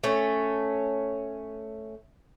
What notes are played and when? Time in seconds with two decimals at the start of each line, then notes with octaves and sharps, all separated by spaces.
0.04 A3 C#4